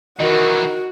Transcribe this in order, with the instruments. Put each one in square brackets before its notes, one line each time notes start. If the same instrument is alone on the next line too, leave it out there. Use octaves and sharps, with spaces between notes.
[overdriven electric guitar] D#3 E3 [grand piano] D#4 A#4 [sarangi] F#4